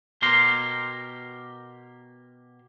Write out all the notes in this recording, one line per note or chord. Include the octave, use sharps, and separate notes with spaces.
B2 G4 A#4 C6